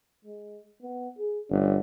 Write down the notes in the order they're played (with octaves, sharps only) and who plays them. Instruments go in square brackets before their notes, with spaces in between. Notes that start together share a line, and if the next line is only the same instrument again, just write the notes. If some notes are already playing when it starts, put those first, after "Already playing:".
[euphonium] G#3
B3
G#4
[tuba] G1 [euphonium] C#4